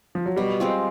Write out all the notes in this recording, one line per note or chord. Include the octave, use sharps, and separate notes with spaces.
F3
F#3
B2 G3
G#3 C4 F4